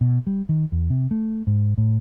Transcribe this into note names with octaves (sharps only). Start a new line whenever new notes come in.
B2
G3
D#3
E2
C3
A3
G#2
A2